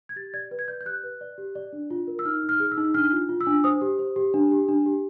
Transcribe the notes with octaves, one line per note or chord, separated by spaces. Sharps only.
G#6
G4 A6
D5 G#6
B4
G#6
D5 G6
G6
G4 F#6
B4
D5
G4
D5
D4
F4
A#4
E6
D#4 F6
D#4
F6
G#4
E6
D#4
D4 F6
F4
F4
E6
D4
C5 D#6
G4
C5
G4
D4
G4
D4
G4